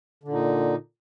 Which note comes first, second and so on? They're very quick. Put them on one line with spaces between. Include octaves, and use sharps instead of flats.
D3 A#2 D#4